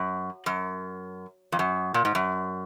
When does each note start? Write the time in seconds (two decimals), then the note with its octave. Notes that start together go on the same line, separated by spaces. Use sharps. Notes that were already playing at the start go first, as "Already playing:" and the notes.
Already playing: F#2
0.46 F#2
1.52 F2
1.59 F#2
1.94 A#2
2.05 G#2
2.15 F#2